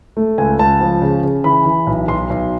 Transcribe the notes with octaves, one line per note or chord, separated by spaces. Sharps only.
A3
C#2 G#5
C#2 A5
F3
C#3
C#3
E3 B5
E3
B1
B1 C6
B1